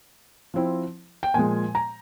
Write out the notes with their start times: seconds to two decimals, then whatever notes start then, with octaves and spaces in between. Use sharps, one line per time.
0.54 F3 C4 E4
1.23 G5
1.34 A#2 F3 G#3 G#5
1.75 A#5